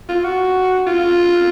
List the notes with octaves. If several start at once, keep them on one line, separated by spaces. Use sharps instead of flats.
F4
F#4
F4